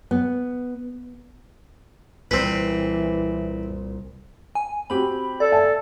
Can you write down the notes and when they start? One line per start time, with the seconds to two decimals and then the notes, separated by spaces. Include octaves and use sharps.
0.11 B3
2.31 C2 A#2 E3 C4 B4
4.55 G#5
4.90 C4 F#4 G4 B5
5.40 A4 D5
5.52 E5 G#5 A5